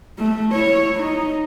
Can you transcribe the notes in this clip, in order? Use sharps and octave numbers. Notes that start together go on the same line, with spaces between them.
A3
E4 C#5
D#4